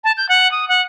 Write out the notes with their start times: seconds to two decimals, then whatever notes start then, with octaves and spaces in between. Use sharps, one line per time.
0.04 A5
0.17 G6
0.29 F#5
0.52 D#6
0.69 F#5